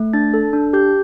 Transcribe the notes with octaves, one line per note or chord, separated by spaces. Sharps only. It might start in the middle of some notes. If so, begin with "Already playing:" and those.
Already playing: A3
D4 A6
A4
D4
G4 G6